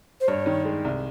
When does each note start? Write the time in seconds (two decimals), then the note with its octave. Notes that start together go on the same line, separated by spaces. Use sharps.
0.20 C5
0.28 G2 C#5
0.46 D#3
0.65 G#3
0.84 C2